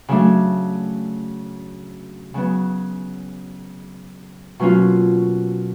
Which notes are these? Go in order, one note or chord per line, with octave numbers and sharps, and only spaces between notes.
C#3 F#3 A3 D4
C#3 F#3 B3
B2 F#3 A#3 C#4 F4